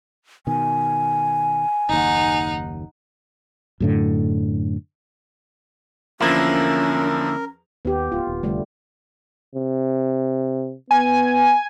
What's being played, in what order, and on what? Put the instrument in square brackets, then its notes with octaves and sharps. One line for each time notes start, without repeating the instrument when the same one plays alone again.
[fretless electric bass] B2 D#3 [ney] G#5
[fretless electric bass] F#1 D#2 [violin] D#4 F#5
[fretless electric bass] F#2 A2 D3
[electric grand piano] E2 F3 [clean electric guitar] D3 A#3 E4 [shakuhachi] C#4 [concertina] A#4
[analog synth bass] D#2 [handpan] B3 G4
[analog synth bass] D1 [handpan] F4
[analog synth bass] D#1
[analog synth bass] F1 [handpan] D3 G3 A3
[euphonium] C3
[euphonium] B3 [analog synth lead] G#5